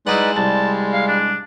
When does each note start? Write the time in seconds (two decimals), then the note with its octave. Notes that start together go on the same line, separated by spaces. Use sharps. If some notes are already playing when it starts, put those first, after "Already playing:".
0.07 G#3 D#4 E4 G#4 B4 D5 F#5
0.36 C2 G3 A5
0.93 F5
1.08 D4